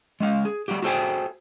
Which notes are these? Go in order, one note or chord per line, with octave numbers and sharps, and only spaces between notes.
G#3 C#4 F5
G#4
G3 A3 F#4 G4
F#4 G#4 A4 C5 G5 G#5